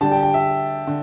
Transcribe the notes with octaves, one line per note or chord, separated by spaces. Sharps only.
D3 G3 D4 G4 A5
G5
G5
E5
D3